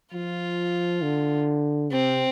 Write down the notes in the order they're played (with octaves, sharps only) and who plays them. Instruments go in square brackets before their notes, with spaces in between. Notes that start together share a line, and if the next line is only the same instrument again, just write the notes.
[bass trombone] F3 [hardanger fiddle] F4
[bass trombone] D3
[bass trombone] C3 [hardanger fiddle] C4